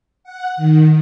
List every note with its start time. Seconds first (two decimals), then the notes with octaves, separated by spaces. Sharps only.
0.24 F#5
0.57 D#3